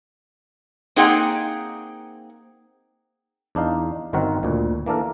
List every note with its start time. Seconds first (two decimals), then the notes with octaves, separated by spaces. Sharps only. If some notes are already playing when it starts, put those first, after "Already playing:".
0.96 A#3 C4 D#4 G#4 F#5 G5
3.55 E2 D4 D#4 F5
4.13 G1 D#3 C4 F#4 A#4 F#5
4.43 D2 A#2
4.86 E3 A#3 D4 A4 A#4